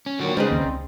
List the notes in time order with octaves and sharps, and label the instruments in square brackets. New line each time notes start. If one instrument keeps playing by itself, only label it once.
[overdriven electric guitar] C#4
[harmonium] A#2 D#3 F#3 [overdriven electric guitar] D3 F#4
[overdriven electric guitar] C#3 [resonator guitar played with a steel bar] G3 D#4 G#4 [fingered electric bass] G#3 [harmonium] B4 C5
[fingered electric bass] D#2 D#3 A#3 [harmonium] C4
[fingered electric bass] C#2